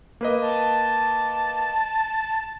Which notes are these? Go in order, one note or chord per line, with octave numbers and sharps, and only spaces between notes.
A#3 B4 D#5
A5